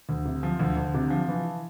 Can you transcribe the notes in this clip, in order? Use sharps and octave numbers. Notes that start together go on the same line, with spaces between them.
D2
C3
F3
D2
D2
C3 D4
F3
E3